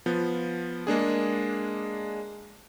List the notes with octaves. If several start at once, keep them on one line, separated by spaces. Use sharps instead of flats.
F3 B3
G#3 A#3 D4 G#4